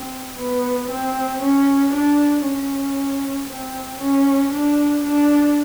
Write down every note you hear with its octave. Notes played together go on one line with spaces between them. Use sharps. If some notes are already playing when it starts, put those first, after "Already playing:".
Already playing: C4
B3
C4
C#4
D4
C#4
C4
C#4
D4
D4